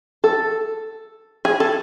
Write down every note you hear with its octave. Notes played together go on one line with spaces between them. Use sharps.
A4
G#4
A4